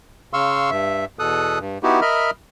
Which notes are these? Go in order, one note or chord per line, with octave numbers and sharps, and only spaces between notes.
C#3 F5 C6 C#6 E6
G2 E5
E2 B2 A4 D#6 F#6
G2
B3 D#4 E4 F#4 G4
A#4 D#5 E5 B5 F6